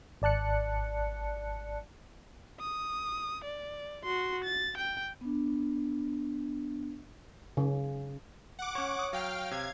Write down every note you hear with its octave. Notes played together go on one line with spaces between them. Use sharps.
G#1 D5 A5 F#6 C#7
D#6
D5
F#4 C6
A6
G5
B3 D4
C#3
F#5 D6
C#4 C#5 C#6
D#6
F#3 F5 G5 F6
C3 F5 G#6